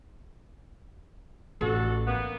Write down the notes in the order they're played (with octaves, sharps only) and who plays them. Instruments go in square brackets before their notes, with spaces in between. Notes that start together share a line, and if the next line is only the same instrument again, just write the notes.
[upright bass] A1 [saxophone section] D4 F#4 A4
[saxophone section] A#3 B3